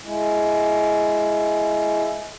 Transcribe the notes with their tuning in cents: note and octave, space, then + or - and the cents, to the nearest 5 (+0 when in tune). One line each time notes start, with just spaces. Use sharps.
G#3 +20 E4 +15